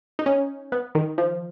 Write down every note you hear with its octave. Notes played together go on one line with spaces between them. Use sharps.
D#4
C#4
B3
D#3
F3